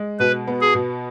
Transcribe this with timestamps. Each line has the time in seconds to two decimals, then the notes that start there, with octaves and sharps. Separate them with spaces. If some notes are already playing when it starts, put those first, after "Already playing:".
Already playing: G#3
0.19 B2 B4
0.47 B3
0.61 G#4
0.75 B2